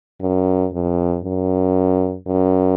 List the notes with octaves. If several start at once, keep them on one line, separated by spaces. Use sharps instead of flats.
F#2
F2
F#2
F#2